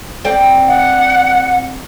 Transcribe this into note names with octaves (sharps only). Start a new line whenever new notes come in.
C4 D5 G5
F#5